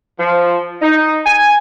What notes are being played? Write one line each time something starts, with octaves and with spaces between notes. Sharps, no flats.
F3
D#4
G#5